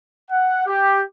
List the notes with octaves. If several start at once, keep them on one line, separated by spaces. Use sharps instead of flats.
F#5
G4